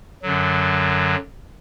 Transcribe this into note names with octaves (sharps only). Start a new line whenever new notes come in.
F#2 D3 F#3